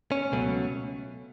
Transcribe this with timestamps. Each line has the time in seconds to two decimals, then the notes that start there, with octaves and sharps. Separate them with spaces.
0.12 C#4
0.32 C#2 B2 F#3 A3